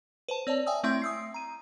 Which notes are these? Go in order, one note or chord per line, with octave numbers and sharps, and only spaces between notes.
B4 C5 A5
C4 C#5 D5 A5
E5 G5 G#5 D#6 E6
A3 C4 E4 E5 C6 G6
D#6 E6 C7
A#5 D#7